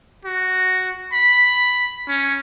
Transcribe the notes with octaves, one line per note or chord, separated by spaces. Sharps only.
F#4
B5
C#4